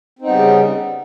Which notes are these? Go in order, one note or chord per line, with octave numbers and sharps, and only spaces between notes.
C#3 G3 B3 C4 D#4